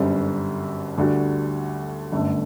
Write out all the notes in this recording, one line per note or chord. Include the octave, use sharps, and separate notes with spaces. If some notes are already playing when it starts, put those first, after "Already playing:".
Already playing: G1 F#2 D3 G3 C4
D2 D3 G3 D4 F#4
G1 F#2 D3 A3